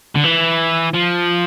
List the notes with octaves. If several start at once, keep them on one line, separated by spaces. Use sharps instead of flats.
D3
E3
F3